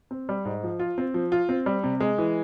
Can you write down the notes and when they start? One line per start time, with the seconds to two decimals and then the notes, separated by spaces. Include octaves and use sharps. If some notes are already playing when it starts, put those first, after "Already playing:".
0.11 C4
0.29 G3
0.45 G#2
0.63 F3
0.80 F4
0.98 C4
1.14 F3
1.32 F4
1.49 C4
1.66 G3
1.84 C3
2.00 G#3
2.18 E3